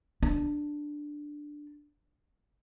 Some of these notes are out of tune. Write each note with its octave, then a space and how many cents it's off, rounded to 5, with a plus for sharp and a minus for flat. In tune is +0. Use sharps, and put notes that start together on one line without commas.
D4 +5